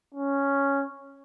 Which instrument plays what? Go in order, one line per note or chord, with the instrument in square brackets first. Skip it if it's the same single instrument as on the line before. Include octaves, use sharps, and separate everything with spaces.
[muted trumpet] C#4